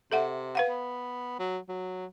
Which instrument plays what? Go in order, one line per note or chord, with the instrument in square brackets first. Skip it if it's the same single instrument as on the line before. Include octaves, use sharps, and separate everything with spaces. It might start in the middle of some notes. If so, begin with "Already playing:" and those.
[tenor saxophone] C3 [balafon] A4 E5 F#5
[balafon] B4 F5 F#5
[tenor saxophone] B3
F#3
F#3